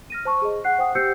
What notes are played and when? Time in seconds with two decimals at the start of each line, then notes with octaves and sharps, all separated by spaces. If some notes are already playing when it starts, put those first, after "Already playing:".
0.10 F6 A#6 D#7
0.25 C5 A5 C#6
0.42 G#4 D#5
0.64 F#5 F#6 C7
0.79 C5 F#5 G5 D#6
0.95 G4 C5 E6 G6 C7 C#7